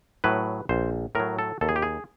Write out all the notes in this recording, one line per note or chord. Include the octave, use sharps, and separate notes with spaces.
A2 F#3 B4
A#1 C5
A2 F#3 A#4
A4
D#2 A4
G#4
G4
G#4